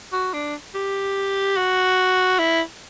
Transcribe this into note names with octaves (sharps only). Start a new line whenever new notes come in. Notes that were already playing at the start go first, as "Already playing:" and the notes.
F#4
D4
G4
F#4
E4